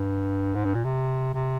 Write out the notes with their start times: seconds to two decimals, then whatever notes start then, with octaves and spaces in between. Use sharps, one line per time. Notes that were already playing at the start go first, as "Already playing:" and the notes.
Already playing: G2
0.55 G#2
0.65 G2
0.75 A#2
0.85 C3
1.34 C3